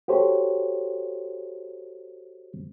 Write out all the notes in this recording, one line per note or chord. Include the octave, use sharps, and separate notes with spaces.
F#4 G4 A4 C5 C#5